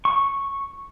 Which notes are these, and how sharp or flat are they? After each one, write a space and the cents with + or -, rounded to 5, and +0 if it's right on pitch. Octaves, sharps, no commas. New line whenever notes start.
C#6 -10